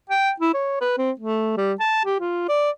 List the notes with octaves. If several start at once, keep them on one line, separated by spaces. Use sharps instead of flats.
G5
E4
C#5
B4
C4
A3
G3
A5
G4
F4
D5